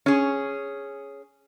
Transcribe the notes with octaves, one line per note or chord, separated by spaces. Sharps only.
C#4 G#4